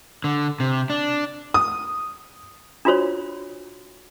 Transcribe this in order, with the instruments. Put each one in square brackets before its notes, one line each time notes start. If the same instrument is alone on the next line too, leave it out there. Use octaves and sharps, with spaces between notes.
[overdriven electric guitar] D3
C3
D4
[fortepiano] D#6
[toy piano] D4 F4 F#4 C5 C#5